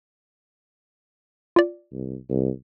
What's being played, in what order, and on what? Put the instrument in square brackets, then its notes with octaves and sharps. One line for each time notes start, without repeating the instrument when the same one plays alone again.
[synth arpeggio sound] F4 D5
[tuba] C2
C2